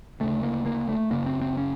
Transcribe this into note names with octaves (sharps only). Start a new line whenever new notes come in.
D2 C#3 A3
A#3
A#3
A3
F#1 F2 C#3 A#3
C4
C4
C#4